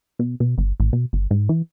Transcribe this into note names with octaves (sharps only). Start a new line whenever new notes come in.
B2
B2
G1
A1
B2
G1
G#2
E3